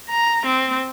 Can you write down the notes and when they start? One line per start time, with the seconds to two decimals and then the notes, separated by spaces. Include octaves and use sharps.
0.10 A#5
0.46 C4